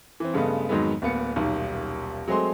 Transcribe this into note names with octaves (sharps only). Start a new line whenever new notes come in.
E3 C4
G2 C#3 G#3 A3 B3
F2 G#2 D#3 F#3 G#3 B3
D1 A#3 B3 C#7
D#1 B1 D#3
F#3 G#3 A3 C4 G#4 C6